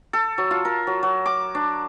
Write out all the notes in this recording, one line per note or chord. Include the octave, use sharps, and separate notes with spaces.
A4
F#3
F4
A#4
F#3
F#3
D6
D4